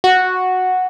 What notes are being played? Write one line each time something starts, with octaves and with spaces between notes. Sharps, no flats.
F#4